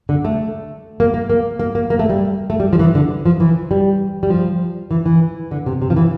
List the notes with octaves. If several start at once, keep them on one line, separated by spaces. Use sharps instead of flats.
D3
A3
A#3
A#3
A#3
A#3
A#3
A#3
A3
G3
A3
G3
F3
E3
D3
F3
E3
G3
G3
F3
E3
E3
D3
C3
C3
F3
E3